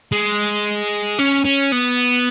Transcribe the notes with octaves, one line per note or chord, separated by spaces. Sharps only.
G#3
C#4
C#4
B3